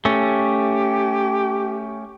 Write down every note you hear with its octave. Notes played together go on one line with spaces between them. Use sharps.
A3 C#4 G4